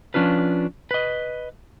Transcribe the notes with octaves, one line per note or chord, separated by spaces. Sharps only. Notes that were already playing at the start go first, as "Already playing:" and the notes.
F3 C#4 D4 F4 B4
B4 D#5